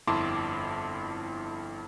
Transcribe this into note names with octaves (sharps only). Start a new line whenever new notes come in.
G1 F2 E4 A5 C6 D6